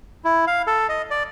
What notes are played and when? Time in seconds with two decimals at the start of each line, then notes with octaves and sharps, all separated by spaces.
0.24 E4
0.47 F5
0.67 A4
0.89 D#5
1.11 D5